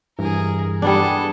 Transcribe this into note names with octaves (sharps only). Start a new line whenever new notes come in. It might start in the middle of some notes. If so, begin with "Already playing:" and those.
G2 E3 G#4 A#4
G3 B3 D4 G#4 A4